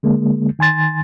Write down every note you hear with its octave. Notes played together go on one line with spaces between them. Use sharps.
D3 G#3 A#3
D#3 G#5 C6 A6